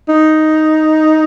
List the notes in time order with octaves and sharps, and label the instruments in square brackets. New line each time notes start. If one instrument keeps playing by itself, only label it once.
[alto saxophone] D#4